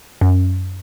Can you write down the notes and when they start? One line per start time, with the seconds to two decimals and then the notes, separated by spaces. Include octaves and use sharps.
0.21 F#2